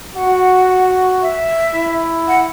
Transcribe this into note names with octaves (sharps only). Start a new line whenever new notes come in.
F#4 F#5
E5
E4
F#5